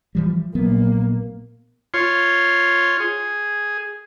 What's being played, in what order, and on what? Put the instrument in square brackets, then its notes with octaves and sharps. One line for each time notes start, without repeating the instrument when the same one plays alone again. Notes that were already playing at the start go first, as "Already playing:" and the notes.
[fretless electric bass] E3 F3 G3
[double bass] A#1 A#3 [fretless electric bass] F#3 B3
[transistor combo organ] F4 C#5 C6
G#4